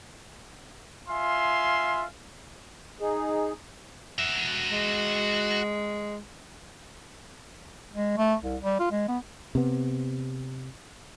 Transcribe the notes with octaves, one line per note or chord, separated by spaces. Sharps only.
F4 E5 F5 G#5 C6
D#4 G#4
F#4 E5
G#3
G#3
A3
C2
G3
F4
G#3
B3
C3 B3